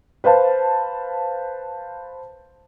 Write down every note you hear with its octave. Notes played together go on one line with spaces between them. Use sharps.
B4 C5 F5 A5